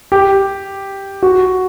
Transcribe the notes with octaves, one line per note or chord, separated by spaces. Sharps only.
G4
F#4